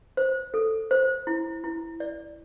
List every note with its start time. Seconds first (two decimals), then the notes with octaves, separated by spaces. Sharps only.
0.17 C5
0.54 A4
0.91 C5
1.27 E4
1.64 E4
2.00 D5